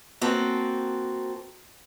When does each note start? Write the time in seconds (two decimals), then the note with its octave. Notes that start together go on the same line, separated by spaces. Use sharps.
0.21 A#3 C4 F#4 A4